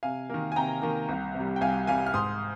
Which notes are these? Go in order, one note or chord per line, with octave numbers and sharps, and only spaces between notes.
C3 F5 G#5
D#3 A#3
G#5
C3 G5 A#5
D#3 A#3
C2
C3
G3
G5
C2 F5 G#5
C3 G3 F5 G#5
F6
G#2 C6 D#6